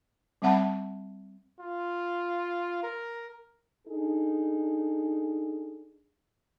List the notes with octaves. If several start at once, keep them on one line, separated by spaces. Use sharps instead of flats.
G3 C4 E5 F#5 A5 B5
F4
A#4
D4 D#4 G#4 A4